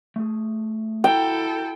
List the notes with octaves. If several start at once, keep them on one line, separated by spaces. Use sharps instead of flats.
A3 G#4
E4 F#4 A4 G5 A#5